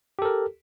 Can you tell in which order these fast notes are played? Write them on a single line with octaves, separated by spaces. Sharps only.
G4 A4 A#4